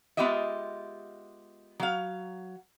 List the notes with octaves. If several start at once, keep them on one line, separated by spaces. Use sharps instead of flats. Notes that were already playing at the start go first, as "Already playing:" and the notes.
G#3 B3 F4 G4 D#5 E5
F#3 F5